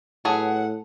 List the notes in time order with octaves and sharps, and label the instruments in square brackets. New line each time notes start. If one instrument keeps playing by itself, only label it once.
[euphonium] A2 [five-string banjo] F#3 G#4 B4 [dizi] F#5 [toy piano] A5